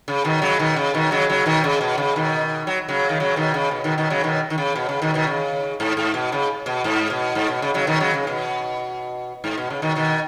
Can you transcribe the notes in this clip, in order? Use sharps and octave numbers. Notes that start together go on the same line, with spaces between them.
C#3
B2 D#3
C#3 F#3
B2 D#3
C#3
B2 D#3
C#3 F#3
C#3 F#3
B2 D#3
C#3
B2
C#3
B2 D#3
F#3
C#3 F#3
D#3
C#3 F#3
B2 D#3
C#3
B2
B2 D#3
B2 D#3
C#3 F#3
B2 D#3
D#3
C#3
B2
C#3
B2 D#3
B2 D#3
C#3
G#2
G#2
B2
C#3
B2
G#2
B2
G#2
B2
C#3
C#3 F#3
B2 D#3
C#3 F#3
C#3
B2
G#2
B2
C#3
B2 D#3
B2 D#3